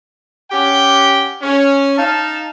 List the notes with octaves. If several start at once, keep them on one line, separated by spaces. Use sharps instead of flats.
C#4 G4 F#5 G5
C#4
D#4 F5 A5